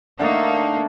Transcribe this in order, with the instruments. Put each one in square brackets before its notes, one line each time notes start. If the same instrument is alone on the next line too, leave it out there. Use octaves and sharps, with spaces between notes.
[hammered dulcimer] D3 A3 A4 [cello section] A#3 D#4